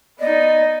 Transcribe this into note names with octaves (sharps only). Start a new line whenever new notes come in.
B3 D#4 D5 D#5